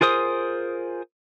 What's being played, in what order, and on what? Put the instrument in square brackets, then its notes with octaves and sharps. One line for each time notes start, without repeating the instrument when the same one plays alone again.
[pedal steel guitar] F4 G#4 A#4 C5 D#6